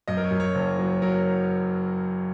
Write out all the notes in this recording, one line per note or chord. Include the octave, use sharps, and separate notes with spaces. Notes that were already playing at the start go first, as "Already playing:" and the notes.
F#2 D#5
A#4
C#5
F#2
C#5
F#1
F#3
F#3 A#4